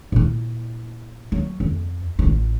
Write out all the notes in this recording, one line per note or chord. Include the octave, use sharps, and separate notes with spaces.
A#2 E4
F#3
F2
A1 F4